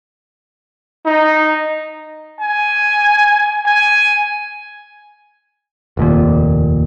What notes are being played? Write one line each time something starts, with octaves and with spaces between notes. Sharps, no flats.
D#4
G#5
G#5
F1 D#2 A#2